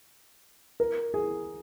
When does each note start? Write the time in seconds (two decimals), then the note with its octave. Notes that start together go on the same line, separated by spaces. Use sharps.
0.80 A#4
1.14 G#4